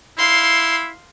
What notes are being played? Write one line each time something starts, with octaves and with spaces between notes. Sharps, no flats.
E4 F5 C6